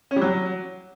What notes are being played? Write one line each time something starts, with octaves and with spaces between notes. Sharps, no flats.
C#4
G3
F#3